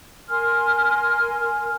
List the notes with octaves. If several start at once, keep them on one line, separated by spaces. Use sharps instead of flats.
A#4 G#5 C6 F6